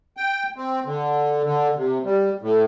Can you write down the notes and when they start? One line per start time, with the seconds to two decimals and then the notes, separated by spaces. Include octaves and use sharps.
0.17 G5
0.56 C4
0.85 D3
1.44 D3
1.76 C3
2.05 G3
2.42 A2